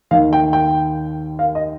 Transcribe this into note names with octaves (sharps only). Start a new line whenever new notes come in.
D#2 D#3 F5
G5
G5
F5
D#5